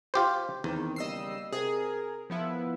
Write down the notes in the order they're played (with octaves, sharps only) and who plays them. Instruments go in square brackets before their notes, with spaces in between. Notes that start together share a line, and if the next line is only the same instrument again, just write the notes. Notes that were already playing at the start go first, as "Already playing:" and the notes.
[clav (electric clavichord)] F4 G4 C5
[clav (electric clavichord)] E2 [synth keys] D#3 [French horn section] C4
[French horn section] C#3 G3 A#3 [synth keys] D#5 E6 C7
[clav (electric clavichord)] C3 [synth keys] G#4 [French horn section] A#4
[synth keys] F3 B3 E4